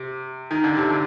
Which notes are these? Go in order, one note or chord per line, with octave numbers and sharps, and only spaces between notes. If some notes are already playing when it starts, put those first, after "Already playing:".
Already playing: C3
D#3
D3
C3
D3